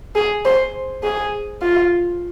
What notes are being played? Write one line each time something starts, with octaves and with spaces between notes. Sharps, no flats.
G#4
C5
G#4
F4